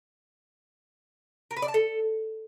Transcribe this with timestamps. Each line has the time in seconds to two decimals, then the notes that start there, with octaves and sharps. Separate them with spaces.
1.51 A#4
1.57 B4
1.62 D5
1.68 A5
1.74 A4